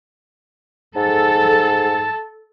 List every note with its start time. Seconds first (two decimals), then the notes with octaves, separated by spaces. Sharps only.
0.96 G#2 A4 A5